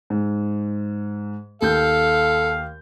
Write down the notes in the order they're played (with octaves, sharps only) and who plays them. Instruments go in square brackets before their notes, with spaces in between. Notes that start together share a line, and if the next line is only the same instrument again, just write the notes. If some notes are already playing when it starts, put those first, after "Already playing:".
[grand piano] G#2
[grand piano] D#2 G6 [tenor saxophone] A4 [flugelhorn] F5